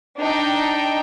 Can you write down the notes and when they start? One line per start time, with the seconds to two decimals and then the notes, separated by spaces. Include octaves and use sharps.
0.21 D4 D#4 G5